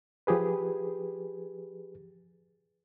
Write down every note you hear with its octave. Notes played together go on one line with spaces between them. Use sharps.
F3 G4 G#4 B4